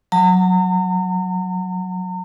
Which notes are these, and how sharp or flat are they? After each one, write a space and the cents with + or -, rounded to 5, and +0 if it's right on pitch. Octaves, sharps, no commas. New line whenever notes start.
F#3 +0 A#5 -40